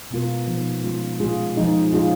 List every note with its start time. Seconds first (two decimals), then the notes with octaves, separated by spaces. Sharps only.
0.10 B2 G#3 B3 F4 A#4
0.47 A#2 F3 B3 D#4
0.84 G#3 C#4 F4
1.20 A#2 G#3 C#4 F4 G#4
1.57 F3 G#3 D#4 G#4
1.92 A#2 G#3 C#4 F4 G#4